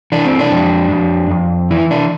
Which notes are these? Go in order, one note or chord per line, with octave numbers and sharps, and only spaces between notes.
E3 D4
C4
D4
F2
F2
F2
E3 E4
D4